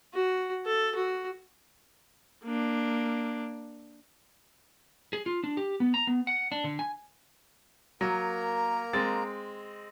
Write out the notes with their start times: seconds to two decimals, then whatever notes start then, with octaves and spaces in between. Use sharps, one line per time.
0.14 F#4
0.66 A4
0.95 F#4
2.44 A#3 D4
5.13 G#4
5.26 F4
5.44 D4
5.57 G4
5.80 B3
5.94 A#5
6.07 B3
6.27 F#5
6.52 D4
6.64 D3
6.79 G#5
8.01 F#3 A#3 A#4 A#5
8.93 G#3 C4 A6